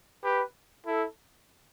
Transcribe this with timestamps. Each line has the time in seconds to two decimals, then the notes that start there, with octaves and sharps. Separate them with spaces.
0.24 G4 B4
0.86 E4 A4